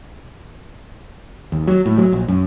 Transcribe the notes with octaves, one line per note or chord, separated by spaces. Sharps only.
D#2
F#3
A2
F#3
A#1
F#2